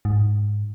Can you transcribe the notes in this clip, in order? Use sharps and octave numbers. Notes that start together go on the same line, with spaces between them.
G#2